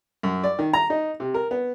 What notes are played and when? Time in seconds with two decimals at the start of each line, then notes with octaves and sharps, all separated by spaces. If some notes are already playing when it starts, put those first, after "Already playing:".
0.23 F#2
0.44 D5
0.59 D#3
0.73 A#5
0.90 D#4
1.20 C3
1.34 A#4
1.51 B3